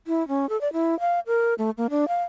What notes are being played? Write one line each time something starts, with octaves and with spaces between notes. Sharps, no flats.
E4
C#4
A4
D5
E4
F5
A#4
A3
A#3
D4
F5